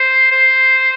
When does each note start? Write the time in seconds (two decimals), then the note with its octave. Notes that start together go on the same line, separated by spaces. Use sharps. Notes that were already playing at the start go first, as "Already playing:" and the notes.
Already playing: C5
0.31 C5